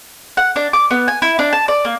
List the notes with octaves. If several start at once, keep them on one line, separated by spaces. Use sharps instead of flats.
F#5
D4
D6
B3
G#5
E4
D4
A5
D5
A#3